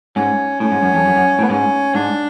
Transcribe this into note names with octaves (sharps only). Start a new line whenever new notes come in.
G#2 C#4
A2 C#4
G#2
F#2
F2
F#2
F#2
A2
B3
G#2 C#4
G#2 D4